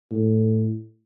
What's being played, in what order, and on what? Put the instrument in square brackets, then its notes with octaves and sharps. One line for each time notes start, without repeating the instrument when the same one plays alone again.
[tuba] A2